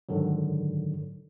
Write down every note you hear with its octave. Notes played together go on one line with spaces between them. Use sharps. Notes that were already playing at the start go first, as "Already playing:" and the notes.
G#2 D3 D#3 F#3